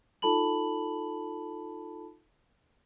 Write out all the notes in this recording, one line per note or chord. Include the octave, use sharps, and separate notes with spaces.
D#4 F4 A4 A5 B5 F#7